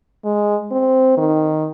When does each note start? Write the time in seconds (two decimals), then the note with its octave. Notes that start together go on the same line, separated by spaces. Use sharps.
0.24 G#3
0.72 C4
1.17 D#3